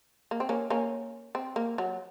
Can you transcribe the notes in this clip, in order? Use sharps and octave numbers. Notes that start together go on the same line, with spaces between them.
A#3
C4
A#3 C#4
A#3 C#4
C4
A#3
F#3